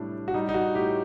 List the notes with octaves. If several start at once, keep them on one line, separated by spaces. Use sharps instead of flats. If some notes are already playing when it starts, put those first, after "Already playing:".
Already playing: A2 C3 F#3 G3 D4
F#4
G3 D#4
D#4
F#4
A2 G4